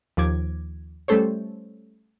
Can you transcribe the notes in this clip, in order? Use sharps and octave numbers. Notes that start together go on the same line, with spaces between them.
D#2 F3 D6 G#6
G3 A3 C#4 A4 C5 C#5